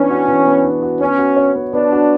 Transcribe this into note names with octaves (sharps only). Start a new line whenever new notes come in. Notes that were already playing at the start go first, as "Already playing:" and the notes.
Already playing: E3 B3 C#4 D4
F#4
E3
B3
D4
F#4
B3 C#4
F#4
C#5
B3
B3 D4
F#4